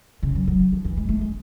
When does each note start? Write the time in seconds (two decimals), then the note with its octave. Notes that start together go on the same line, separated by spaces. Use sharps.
0.23 C#3
0.35 F#3
0.48 F#3
0.73 F3
0.85 E3
0.97 G#3
1.09 A3
1.21 G#3